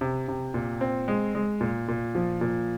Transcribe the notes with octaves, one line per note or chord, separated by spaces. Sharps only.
C3
C3
A#2
C4
G#3
G#3
A#2
A#2
F3
A#2